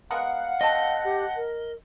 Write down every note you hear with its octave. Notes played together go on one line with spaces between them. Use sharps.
G#3 B3 A#4 F5 F#5
A3 C4 D#5 A5
G4
A#4